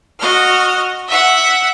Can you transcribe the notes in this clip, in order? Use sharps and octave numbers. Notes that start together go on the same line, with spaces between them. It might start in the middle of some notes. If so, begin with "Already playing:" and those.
F#4 D#5 F6
E5 F#5